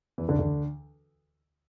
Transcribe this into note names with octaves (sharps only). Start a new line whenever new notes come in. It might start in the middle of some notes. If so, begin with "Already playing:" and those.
E2 E3
D2 D3
D2 D3